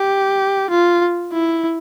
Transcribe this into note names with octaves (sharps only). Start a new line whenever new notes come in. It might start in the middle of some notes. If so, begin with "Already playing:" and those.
Already playing: G4
F4
E4